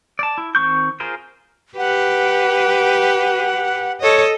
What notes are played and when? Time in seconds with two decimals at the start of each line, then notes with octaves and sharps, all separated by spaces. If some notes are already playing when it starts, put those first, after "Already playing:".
0.19 D5 A5
0.38 E4
0.55 D#3 C4 C#6 G6
1.00 F4 G#4 A#4 C5
1.78 G4 B4 F#5
4.01 A4 C#5 D#5